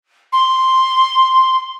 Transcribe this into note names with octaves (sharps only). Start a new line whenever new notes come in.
C6